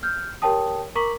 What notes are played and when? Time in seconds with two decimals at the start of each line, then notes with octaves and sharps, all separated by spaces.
0.03 F6 G6
0.42 G4 A#4 C#5 G5 A5 D#6
0.95 A#4 A#5 C#6 D6 B6 F#7